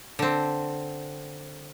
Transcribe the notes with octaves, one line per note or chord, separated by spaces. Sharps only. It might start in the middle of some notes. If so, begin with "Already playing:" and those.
D3 C4